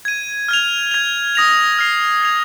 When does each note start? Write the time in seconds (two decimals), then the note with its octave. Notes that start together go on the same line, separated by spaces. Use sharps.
0.05 G#6 D#7
0.49 F6 G#6 F7
0.91 G#6 F7
1.35 D#6 A#6 F7
1.79 F6 C7 F7
2.22 G#6 C7 F7